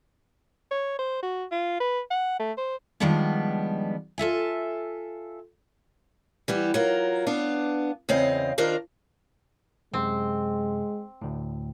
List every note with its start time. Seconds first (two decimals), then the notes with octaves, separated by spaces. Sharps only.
0.71 C#5
0.99 C5
1.23 F#4
1.51 F4
1.80 B4
2.10 F#5
2.39 A3
2.57 C5
3.00 D#3 F3 G3 G#3 B3 D4
4.18 F4 A4 E5 G#5
6.48 E3 G3 B3
6.74 F#3 F4 A#4
7.27 B3 D4 F5
8.09 E2 C#3 C4 D#5 F5
8.58 D#3 D4 F4 A#4 C5
9.94 F#2 C3 G#3 C4
11.22 D2 A2